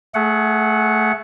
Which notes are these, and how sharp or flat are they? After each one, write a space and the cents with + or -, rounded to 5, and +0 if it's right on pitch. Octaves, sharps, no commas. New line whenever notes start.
A3 +0 G#4 +30 F#5 +0